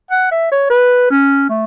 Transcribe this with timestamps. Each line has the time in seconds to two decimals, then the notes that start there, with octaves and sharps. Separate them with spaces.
0.11 F#5
0.31 E5
0.51 C#5
0.70 B4
1.10 C#4
1.49 A3